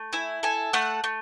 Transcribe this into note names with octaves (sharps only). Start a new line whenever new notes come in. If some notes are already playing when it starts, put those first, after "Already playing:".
Already playing: A3
E4 G#5
A4 G#5
A3 F#5
A3